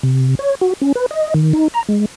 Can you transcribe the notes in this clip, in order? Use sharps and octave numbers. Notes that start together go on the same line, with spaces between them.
C3
C#5
F#4
C#4
B4
D#5
D#3
D#4
A#5
G#3